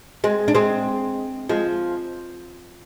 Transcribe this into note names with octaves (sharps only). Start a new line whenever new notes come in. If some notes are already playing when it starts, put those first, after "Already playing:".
G#3 C4
D4
G#3 C4
F3 G#3